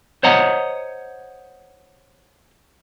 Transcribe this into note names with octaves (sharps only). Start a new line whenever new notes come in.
C5 C#5 D#5 F#5 A#5